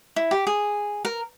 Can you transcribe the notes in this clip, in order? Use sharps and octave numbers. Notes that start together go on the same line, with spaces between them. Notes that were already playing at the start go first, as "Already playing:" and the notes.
E4
G4
G#4
A#4